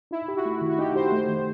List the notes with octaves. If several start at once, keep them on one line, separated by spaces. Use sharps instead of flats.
D#4 E4
G4
F#4
A3
D#3
F#4
D#4 G4
G4 C5
A3 C5
D#3